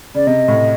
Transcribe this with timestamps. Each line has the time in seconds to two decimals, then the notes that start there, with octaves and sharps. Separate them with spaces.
0.15 C#3 D5
0.27 C3 D#5
0.48 A2